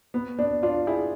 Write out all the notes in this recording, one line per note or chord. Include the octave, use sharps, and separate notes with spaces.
B3
B3 D4
D4 F4
E4 G#4